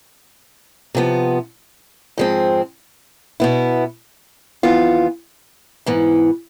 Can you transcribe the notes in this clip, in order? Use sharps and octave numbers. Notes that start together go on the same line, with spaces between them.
C3 F3 B3
G#2 F3 G#3 C4
B2 B3 E4
F2 E3 B3 F4
G#2 E3 B3